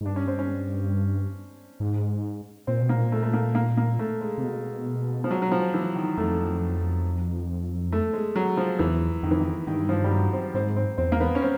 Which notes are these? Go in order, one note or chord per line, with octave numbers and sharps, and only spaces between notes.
G#2
G2 D4
C#4
C4
C#4
G#2
A#2 C4
B2
A#3
A#2
A3
A3
A#3
A#3
A#3
A3
G#3
C3
B2
F3
F#3
F#3
F3
E3
D#3
F2 A3
A3
G#3
F#3
F3
E2 E3
F2 D#3
E3
D#3
G2 D#3
F3
G3
F#3
C4
G#2 C4
C4
E2 C4
A#3
B3
C#4
C4